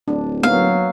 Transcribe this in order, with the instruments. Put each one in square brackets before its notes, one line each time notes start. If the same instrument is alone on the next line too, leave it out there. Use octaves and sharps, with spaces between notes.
[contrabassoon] D1 [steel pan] D4
[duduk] F#3 [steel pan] A#3 B3 D#4 [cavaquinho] F5